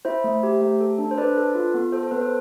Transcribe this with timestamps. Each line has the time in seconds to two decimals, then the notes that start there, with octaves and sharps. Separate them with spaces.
0.05 E4 C5 E5
0.24 A3
0.43 G4
0.61 A3
0.81 A4
0.99 D4
1.11 C5
1.18 D4 B4 D5
1.37 A4
1.55 F4
1.74 B3
1.92 A4 C5
2.03 A4
2.11 B3 B4
2.21 A4 C5